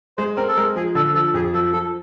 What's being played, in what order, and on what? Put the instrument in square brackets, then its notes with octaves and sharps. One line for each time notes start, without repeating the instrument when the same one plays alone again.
[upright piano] G#3 [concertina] C5
[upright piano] C4 [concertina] A#4
[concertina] A4
[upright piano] G#3 [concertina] A#4
[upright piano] F3 [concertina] G#4
[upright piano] D3 [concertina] A4
[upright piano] F3 [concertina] A4
[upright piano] F2 [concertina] G#4
[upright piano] F3 [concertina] A4
[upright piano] F3 [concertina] A4